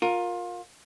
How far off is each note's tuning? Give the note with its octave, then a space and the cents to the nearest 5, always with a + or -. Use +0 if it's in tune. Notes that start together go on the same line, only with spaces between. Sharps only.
F4 +25 A#4 +0